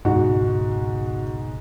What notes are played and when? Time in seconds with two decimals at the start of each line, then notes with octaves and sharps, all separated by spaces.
0.05 G#1 C#2 G#2 B2 F#4